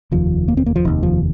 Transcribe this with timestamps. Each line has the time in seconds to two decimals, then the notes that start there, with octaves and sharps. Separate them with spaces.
0.12 F1 D#2 F3
0.48 A#3
0.57 C4
0.66 A#3
0.76 F3
0.85 F1 D#2 D#3
1.03 F3